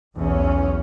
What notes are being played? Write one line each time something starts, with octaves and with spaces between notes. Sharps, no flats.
B1 E2 C#4